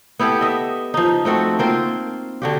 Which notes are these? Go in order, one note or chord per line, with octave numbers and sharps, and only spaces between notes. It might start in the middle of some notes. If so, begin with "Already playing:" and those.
B3 E4 G4 A4
D#5 E5
F3 D#4
A3 C4 F#4 A4
A#3 C4 F4
D3 F#4 G4